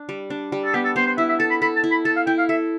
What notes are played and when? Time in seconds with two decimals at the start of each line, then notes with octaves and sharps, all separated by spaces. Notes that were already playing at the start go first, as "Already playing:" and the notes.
Already playing: D4
0.09 G3
0.30 D4
0.52 G3
0.65 A4
0.74 B3 G4
0.84 A4
0.96 B3 C5
1.06 C5
1.17 E4 E5
1.29 E5
1.39 A4 A5
1.50 B5
1.62 A4 B5
1.76 A5
1.84 E4
1.91 B5
2.05 A4 A5
2.16 F5
2.27 E4 G5
2.38 F5
2.49 A4 E5